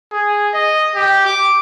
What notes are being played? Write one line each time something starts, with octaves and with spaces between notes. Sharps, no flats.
G#4
D#5
G4
D6